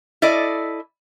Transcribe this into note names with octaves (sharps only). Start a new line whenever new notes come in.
E4 A4 D5 D#5